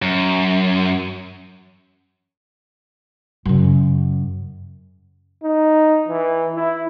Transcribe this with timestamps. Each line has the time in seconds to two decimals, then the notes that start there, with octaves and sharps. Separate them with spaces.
0.02 F#2
3.45 F#2 C#3
5.43 D#4
6.08 E3
6.55 E4